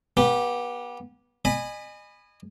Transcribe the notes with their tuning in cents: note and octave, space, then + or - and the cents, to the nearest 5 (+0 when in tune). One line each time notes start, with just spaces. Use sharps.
B3 -30 G4 +0
D#5 -35 G#5 -10 B5 +0